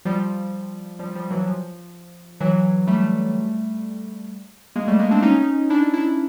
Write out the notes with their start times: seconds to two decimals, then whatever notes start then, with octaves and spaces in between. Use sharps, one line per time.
0.05 F3 G3
0.99 F3 G3
1.15 F3 G3
1.31 E3 F#3
1.47 F3
2.40 E3 F#3
2.87 G3 A3
4.76 G#3 A#3
4.87 G3 A3
4.99 G#3 A#3
5.11 C4 D4
5.22 C#4 D#4
5.70 D4 E4
5.94 D4 E4